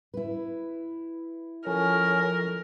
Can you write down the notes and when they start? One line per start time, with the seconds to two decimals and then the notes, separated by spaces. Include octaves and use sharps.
0.14 E4 B4
1.67 F3 C#4 A4 A#4